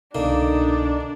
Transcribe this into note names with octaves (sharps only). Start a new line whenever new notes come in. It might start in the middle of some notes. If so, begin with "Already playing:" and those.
C2 B2 D3 A#3 D4 D#4